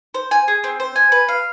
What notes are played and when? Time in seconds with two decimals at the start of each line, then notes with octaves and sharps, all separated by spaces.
0.14 C5
0.31 G#5
0.48 G#4
0.64 C4
0.80 C5
0.96 G#5
1.12 B4
1.28 F5